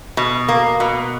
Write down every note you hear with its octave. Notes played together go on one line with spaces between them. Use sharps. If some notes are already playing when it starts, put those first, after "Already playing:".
B2
A#3
B2